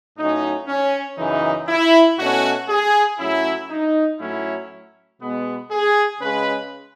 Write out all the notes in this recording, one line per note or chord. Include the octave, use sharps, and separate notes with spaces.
A2 F#3 C#4 D#4
C#4
F#2 C#3 E3 D#4
E4
B2 A3 C#4 F#4
G#4
A2 F#3 C#4 E4
D#4
A2 F#3 A3 C#4 E4
B2 G#3 B3
G#4
C#3 G#3 C#4 B4